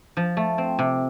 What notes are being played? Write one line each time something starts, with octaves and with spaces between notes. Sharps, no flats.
F3
A3
C4
C3